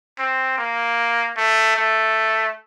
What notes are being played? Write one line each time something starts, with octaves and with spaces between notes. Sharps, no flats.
C4
A#3
A3
A3